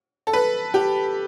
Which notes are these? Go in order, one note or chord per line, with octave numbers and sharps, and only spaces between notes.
A4
B4
G4